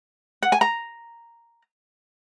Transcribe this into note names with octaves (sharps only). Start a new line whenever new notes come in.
F#5
G#5
A#5